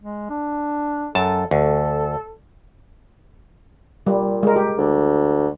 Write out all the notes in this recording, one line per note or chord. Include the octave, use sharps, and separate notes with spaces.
G#3
D4
F#2 A4 A5
D2 A4
A#2 G3
G#3 A#4
G4
D2